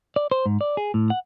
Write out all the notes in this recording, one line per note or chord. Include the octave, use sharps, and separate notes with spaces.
D5
C5
G#2
D5
G#4
A2
F#5